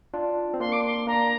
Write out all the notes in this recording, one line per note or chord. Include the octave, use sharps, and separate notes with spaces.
D4 F4
C4
A#3 D4 C6
D6
C6
A#3 D4 A#5